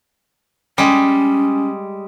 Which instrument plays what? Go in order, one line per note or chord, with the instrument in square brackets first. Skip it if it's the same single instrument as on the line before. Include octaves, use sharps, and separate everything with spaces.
[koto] G3 G#3 [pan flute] C#4